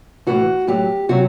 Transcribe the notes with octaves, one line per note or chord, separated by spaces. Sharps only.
A2 E3 F#4
A2 F#3 G4
C3 F#3 F#4